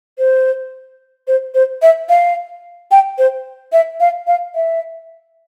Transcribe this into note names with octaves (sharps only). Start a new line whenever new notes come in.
C5
C5
C5
E5
F5
G5
C5
E5
F5
F5
E5